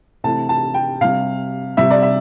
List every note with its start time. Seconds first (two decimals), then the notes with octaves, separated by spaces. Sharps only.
0.24 C3 E3 A3 A5
0.49 A5
0.74 G5
1.01 C3 G3 F5
1.77 C3 G3 E5
1.91 D5
2.02 E5